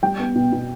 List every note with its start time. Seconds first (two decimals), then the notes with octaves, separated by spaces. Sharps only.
0.03 G3 G5
0.19 B3
0.35 B2
0.52 B2